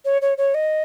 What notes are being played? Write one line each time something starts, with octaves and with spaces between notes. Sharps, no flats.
C#5
C#5
C#5
D#5